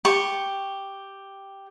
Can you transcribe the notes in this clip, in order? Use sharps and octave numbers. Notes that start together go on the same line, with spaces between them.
G4 C#6